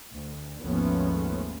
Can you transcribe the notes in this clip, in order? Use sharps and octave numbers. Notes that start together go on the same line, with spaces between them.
D2
G#1 D#2 F3 A3 B3 C#4